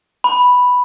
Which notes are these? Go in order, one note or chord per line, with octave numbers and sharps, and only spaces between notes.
B5